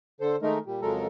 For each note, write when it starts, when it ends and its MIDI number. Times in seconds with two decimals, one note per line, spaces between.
0.21 0.36 50
0.21 0.36 69
0.21 0.36 72
0.42 0.58 51
0.42 0.58 56
0.42 0.58 57
0.42 0.58 63
0.42 0.58 70
0.66 0.81 46
0.66 0.81 55
0.82 1.07 41
0.82 1.07 49
0.82 1.07 54
0.82 1.07 56
0.82 1.07 69
0.82 1.07 70